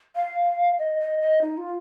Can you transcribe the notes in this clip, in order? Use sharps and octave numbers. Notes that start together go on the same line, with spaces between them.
F5
D#5
D#5
D#5
D#4
F4